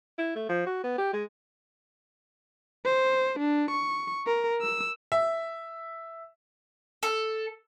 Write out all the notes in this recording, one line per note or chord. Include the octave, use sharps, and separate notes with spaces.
E4
A3
F3
F#4
B3
G4
G#3
C5
D4
C#6
A#4
E6
E5
A4